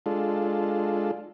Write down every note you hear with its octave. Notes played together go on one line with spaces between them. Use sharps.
G#3 D4 F4 A4